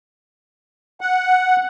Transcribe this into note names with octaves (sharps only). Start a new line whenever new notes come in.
F#5